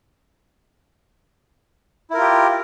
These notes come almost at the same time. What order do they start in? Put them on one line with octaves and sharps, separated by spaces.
E4 A#4 F4 G4